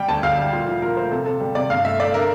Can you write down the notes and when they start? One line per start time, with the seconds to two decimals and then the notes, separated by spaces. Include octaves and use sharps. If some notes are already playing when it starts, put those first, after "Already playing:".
Already playing: G3 G5
0.09 D2 A5
0.23 D2 F5
0.38 G3
0.53 A#2
0.68 F3
0.82 A#2 A#4
0.97 A3 C5
1.11 C3 A4
1.26 C3 A4
1.40 G3
1.55 C3 D5
1.70 G2 F5
1.85 A3 E5
1.99 A3 D5
2.14 D4 A#4